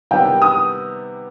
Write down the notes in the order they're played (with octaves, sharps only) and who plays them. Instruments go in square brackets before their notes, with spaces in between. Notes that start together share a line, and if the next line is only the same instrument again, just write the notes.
[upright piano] C3 D#3 G3 B3 [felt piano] G5
[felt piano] D#6